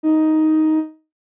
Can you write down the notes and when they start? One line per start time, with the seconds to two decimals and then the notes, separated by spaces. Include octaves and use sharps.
0.03 D#4